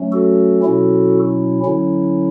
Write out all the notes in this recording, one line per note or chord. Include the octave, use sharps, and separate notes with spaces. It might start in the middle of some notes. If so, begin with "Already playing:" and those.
Already playing: F#3 A3 C#4
F#4 A4
B2 F#3 C#4 E4
D3 F#3 C#4 E4